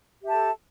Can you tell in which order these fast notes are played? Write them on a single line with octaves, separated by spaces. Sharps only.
G4 E5 A5 A4